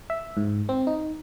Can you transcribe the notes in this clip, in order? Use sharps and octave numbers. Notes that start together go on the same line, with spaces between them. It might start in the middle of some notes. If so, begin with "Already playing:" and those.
E5
G#2
C4
D#4